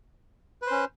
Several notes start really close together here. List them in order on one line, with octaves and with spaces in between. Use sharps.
B4 C5 C#4